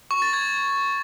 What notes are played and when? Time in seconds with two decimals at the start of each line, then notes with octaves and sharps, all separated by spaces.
0.11 C#6
0.22 A6
0.33 G#6